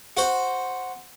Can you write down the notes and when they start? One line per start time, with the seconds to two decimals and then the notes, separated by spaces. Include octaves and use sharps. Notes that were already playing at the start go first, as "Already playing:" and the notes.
0.17 F#4 C5